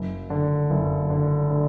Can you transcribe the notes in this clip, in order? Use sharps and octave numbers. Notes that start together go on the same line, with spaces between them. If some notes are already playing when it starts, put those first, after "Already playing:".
Already playing: F#1
D3
F#1
D3
D3